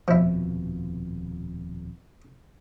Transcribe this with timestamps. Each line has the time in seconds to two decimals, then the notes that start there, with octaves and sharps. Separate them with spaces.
0.08 D#1 F2 B2 F3 E4